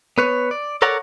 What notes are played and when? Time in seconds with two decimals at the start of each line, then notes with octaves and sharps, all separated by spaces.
0.18 B3 B4 C#5
0.51 D5
0.82 A4 A#4 C#5 D5 F#5 A#5